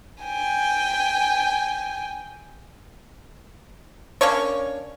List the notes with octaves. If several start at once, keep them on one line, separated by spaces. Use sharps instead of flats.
G5 G#5
A#3 C#4 D4 C#5